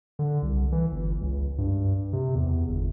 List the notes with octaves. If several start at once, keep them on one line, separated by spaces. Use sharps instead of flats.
D3
C2
E3
G1
C#2
G2
C3
E2
G1